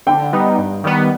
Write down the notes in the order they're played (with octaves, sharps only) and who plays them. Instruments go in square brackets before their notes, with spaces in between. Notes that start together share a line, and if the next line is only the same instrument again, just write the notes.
[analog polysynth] D3 [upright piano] G5
[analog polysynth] G3 B3 D#4
G2
D#3 G3 B3